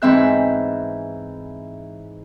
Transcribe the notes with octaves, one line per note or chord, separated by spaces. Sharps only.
G#2 E3 C4 E5 F#6